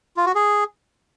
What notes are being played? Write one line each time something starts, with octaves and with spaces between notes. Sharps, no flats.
F4
F#4
G#4